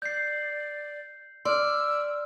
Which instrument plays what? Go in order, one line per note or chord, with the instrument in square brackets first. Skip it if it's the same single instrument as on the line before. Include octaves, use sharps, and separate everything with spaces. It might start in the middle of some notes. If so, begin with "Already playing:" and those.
[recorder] D5 [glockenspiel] G6 C7
[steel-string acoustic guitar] D5 [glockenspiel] C6 F6 [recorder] E6